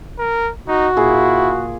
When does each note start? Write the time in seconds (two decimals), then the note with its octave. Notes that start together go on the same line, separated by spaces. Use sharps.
0.19 A#4
0.68 D#4 F#4
0.97 A#2 E4 G#4